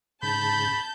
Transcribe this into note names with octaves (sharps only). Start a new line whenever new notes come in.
G#2 C#3 A5 B5 G6